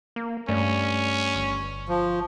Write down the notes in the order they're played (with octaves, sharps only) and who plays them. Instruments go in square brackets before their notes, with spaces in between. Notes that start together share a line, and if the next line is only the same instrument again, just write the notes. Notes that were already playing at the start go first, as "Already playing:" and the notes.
[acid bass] A#3
[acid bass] G2 [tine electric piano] A3 D5 [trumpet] C#4
[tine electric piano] G1 C#6
[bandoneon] F3